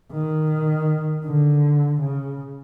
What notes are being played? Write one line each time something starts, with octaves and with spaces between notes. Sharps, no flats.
D#3
D3
C#3